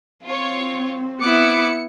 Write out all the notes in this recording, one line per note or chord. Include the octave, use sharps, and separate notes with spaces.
C4 F4 C#5
B3 E4 D6 C#7